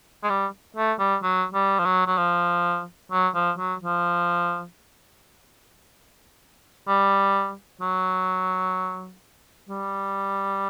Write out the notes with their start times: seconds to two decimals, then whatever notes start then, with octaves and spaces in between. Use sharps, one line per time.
0.23 G#3
0.30 G3
0.76 A3
0.99 G3
1.23 F#3
1.54 G3
1.79 F3
1.85 F#3
2.07 F#3
2.18 F3
3.12 F#3
3.35 F3
3.58 F#3
3.82 F3
6.88 G3
7.81 F#3
9.69 G3